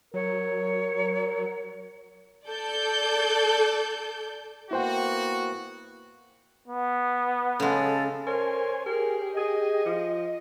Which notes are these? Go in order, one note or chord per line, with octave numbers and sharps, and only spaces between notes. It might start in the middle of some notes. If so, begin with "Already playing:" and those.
F#3 A#4 C#5
A4 D5 G6
A#3 B3 E4 F#4 C5 G5
B3
C#3 G#3 A4
A#4 C5 C#5 G#5
G4 G#4 A#4
G#4 D#5
F3